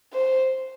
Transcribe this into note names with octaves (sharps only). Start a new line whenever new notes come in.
C5